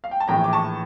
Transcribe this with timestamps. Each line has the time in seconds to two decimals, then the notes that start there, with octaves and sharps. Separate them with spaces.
0.04 F5
0.11 G5
0.20 A5
0.28 A#1 A2 E3 G5 A#5
0.44 D6
0.53 A5 C#6